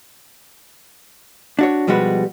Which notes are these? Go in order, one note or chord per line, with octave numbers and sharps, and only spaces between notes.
D4 F#4 C#5
B2 F3 G3 G#3 F#4 B4